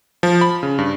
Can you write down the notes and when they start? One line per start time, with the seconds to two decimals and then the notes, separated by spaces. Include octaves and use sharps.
0.23 F3
0.41 B5
0.63 C#3
0.78 G2